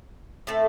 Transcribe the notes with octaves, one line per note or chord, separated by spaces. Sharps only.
A2 A3 C4 A4